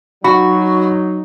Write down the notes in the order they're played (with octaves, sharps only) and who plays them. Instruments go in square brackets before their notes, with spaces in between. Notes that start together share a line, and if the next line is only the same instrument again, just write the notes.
[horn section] F#3 D#4 [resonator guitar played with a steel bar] F#4 [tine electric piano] B5